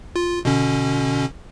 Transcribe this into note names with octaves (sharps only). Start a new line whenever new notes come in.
F4
B2 D3 C#4